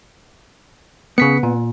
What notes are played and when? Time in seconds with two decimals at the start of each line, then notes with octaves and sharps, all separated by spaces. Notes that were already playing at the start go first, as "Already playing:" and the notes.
1.18 C#3 B3 B6 C#7
1.43 A#2